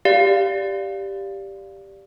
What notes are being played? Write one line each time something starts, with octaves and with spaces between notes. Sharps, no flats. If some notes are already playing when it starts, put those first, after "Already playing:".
G4 D5 F5